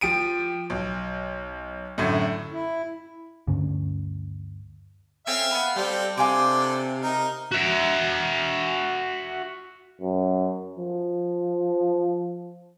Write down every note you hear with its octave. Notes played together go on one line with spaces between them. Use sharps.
F3 G4 D7 D#7
B1
F#2 A2 D3
E4
D2 G2 D3 C#4
C4 C#4 A4 E5 F5
B3 B4
G3 C4 G4 A4 F5
C3 D4 A4 C5 F5 G#5 D6
D#4 A#4
F#4 E5
F#2
F3